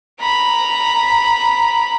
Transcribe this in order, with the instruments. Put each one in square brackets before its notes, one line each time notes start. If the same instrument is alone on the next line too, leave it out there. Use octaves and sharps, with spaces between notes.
[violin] A#5 B5